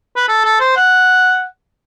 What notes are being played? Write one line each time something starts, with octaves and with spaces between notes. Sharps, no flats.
B4
A4
A4
C5
F#5